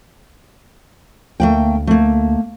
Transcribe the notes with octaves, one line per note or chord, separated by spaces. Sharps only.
D2 A3 A#3 G5
A3 A#3